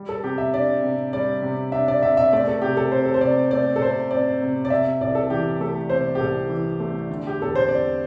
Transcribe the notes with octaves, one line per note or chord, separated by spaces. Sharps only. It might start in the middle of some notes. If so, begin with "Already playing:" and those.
Already playing: G3
A4
C3 G4
E5
D4 D5
C3
G3 D5
C3
D4 E5
D5
C3 E5
E5
A3 D5
A4
C3 G4
A4
C4 C5
A4
C5
C3 D5
A3 D5
A4
C3 C5
C4 D5
C3
D5
C3 E5
C2 D5
A4
E3 G4
A3 A4
C3 C5
G4
C2 A4
E3
A3
D3
G4
E2 A4
C5
C4 D5